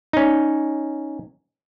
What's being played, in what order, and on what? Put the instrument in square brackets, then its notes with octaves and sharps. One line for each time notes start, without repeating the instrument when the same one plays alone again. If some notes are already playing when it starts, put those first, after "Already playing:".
[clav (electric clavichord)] C#4 D#4